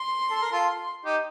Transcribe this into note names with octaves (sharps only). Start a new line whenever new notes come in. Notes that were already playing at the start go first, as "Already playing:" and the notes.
Already playing: C6
A4
A#4
F4 A4
D#4 G4